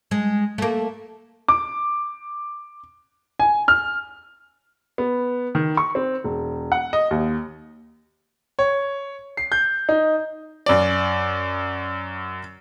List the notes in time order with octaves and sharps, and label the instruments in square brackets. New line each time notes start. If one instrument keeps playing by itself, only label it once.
[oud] G#3
A3 A#3
[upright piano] D6
G#5
F6
B3
D#3
C#6
C4
E1
F#5
D#5
D#2
[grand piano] C#5
C7
G6
D#4
[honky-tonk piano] F#2 D5